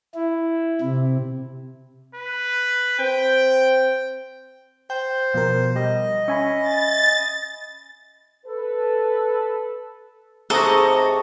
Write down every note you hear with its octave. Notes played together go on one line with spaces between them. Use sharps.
E4
C3
B4
C4 G5
C5 G5
B2 F3 A#4
G3 D#5
C#4 E5 G#5 B5
A6
A4 B4
G#2 C3 A4 A#5 C#6 D#6 A#6